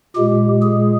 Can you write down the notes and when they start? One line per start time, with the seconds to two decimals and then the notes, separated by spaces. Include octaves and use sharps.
0.15 A#2 G#3 G4
0.62 G#4